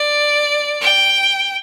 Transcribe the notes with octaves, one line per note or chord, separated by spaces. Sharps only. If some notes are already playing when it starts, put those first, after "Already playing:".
Already playing: D5
G5